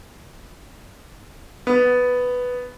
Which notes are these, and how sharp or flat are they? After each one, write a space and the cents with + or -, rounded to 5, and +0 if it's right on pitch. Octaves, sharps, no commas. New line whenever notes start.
B3 +5